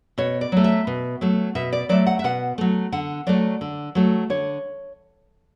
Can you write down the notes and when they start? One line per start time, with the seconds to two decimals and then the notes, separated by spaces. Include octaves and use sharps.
0.18 B2 C#5
0.41 D5
0.52 F#3 A3
0.64 E5
0.87 B2
1.21 F#3 A3
1.55 B2 E5
1.73 D5
1.89 F#3 A3 D5
2.07 F#5
2.19 E5
2.24 B2 F#5
2.58 F#3 A3
2.92 D3 F#5
3.27 F#3 A3 D5
3.61 D3
3.95 F#3 A3
4.30 D3 C#5